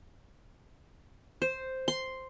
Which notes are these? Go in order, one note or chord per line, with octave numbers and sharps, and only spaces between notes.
C5
C6